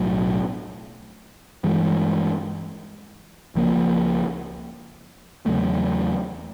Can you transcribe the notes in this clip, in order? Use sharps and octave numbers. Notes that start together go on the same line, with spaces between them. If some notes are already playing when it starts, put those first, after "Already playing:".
Already playing: B1 A2 F#3
G2 E3 G#3
C#2 C#3 F3 A#3
E2 C#3 F#3 A3